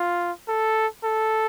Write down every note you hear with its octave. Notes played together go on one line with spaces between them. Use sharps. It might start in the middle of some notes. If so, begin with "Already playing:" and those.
Already playing: F4
A4
A4